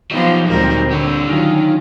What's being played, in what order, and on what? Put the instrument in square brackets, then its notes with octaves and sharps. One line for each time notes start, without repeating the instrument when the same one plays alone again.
[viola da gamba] F3 B3 G4 [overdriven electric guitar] F#3 D#4
[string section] D2 G3 C4 [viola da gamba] A#2 G#3 A#4
[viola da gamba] D3 [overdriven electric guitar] G4 C#5
[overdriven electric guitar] D#3 [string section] F#3 C#4 F4